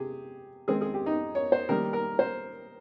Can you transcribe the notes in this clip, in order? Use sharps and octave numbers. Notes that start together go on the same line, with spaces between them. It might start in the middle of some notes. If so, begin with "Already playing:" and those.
Already playing: C3 G4 G#4
D#3 G#3 C4 G#4
G#4
G4
D#4
C#5
C5
D#3 G3 A#3 A#4
A#4
C5